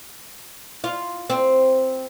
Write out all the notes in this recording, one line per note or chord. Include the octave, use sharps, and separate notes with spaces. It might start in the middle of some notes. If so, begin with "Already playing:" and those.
F4
C4